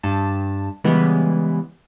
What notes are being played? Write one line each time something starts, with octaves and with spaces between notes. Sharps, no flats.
G2 A5
C#3 E3 G3 G#3 B3